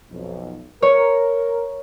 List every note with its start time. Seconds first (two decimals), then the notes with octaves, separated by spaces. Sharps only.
0.11 B1 F2
0.82 A#4 C#5